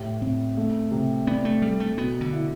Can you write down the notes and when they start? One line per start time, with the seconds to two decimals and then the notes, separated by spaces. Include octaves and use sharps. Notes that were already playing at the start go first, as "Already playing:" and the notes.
Already playing: A2 G4
0.21 A2 C4
0.57 A3
0.91 C3
1.27 B3 D4
1.45 A3
1.62 G3 A4
1.80 A3
1.98 B2 B3
2.21 D3
2.32 E4